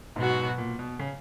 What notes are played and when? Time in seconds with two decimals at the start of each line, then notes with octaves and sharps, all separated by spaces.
0.16 G#2 B2 F#3 B3 F#4
0.58 A#2
0.79 B2
0.99 C#3